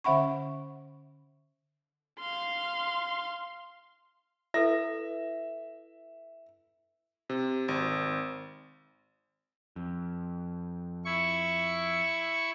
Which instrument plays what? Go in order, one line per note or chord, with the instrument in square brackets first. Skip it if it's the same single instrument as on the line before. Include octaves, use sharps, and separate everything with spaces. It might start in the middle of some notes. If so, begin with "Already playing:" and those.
[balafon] D3 C#4 E5 F#5 B5 C#6
[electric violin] F5 C6
[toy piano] E4 A4 B4 [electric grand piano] E5 A#6
[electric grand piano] C3
G#1
[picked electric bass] F2
[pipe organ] E4 C#6